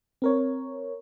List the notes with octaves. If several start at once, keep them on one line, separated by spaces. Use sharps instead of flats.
C4 A#4 C#5